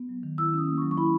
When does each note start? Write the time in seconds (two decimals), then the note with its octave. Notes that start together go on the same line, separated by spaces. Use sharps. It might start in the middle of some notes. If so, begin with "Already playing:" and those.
Already playing: B3
0.09 F#3
0.23 D#3
0.38 E4 E6
0.53 C#4 D#6
0.68 A#3
0.78 C#6
0.82 F#3
0.91 C#6
0.97 E4 B5